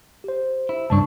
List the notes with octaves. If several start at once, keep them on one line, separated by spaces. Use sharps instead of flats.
G4 C5
E4
C#2 G2 D4 A5 C#6